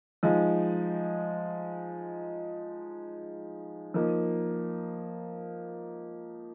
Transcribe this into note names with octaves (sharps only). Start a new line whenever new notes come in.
F3 G#3 D#4
F3 A#3 D#4